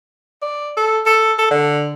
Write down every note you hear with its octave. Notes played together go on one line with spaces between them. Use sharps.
D5
A4
A4
A4
D3